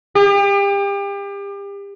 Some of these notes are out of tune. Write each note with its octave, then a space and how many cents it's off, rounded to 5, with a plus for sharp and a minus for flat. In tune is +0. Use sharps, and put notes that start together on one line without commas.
G4 +35